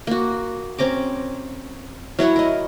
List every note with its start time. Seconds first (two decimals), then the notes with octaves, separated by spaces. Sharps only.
0.07 A#3 F#4
0.78 C4 C#4 A#5 D6
2.19 F#3 E4 C#5 F#5
2.36 A#4 D#5